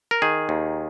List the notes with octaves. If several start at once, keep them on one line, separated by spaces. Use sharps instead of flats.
A#4
D#3 G#4
D#2